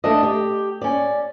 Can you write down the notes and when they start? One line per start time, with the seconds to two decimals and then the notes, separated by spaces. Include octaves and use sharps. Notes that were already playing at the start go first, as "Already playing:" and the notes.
0.04 A3 D4 D#5
0.23 G4
0.81 C#4 D5